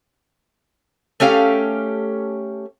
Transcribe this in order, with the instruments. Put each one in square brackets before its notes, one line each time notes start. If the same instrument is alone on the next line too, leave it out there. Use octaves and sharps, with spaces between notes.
[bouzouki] A3 C#4 G4 F5